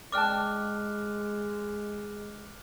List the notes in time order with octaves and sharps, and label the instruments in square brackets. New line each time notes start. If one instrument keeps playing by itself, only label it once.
[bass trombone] G#3 [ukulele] D5 G5 A5 [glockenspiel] D6 F6 F#6